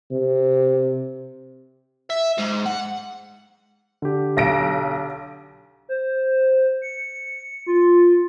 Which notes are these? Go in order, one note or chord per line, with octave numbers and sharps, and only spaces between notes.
C3
E5
G#2
F#5
D3 G4
B1 A#6 D7
C5
C#7
F4